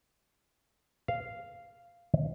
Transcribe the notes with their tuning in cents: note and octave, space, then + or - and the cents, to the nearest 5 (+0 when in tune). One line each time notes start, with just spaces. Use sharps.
F5 -5